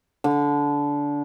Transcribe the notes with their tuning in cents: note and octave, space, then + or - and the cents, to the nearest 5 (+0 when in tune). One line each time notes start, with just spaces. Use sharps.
D3 -20